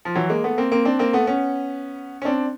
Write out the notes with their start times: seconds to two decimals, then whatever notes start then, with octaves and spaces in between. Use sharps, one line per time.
0.05 F3
0.15 E3 F#3
0.29 G#3 A#3
0.44 A3 B3
0.58 A#3 C4
0.71 A#3 C4
0.85 C4 D4
0.99 A#3 C4
1.13 A3 B3
1.27 B3 C#4
2.22 C#4
2.25 C4 D4